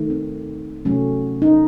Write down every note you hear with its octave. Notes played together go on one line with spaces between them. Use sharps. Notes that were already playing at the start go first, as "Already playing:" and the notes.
Already playing: D#3 A3
C4
C3 F#3 A3 C#4
D#4